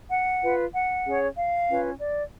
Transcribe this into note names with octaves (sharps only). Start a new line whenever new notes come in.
F#5
F4 B4
F#5
C#4 G#4 C#5
F5
C#4 F4 B4
D5